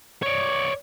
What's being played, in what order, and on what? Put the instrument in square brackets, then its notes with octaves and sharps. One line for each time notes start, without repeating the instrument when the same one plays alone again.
[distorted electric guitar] C#5 D5